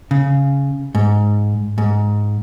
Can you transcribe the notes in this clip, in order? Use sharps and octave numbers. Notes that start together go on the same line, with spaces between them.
C#3
G#2
G#2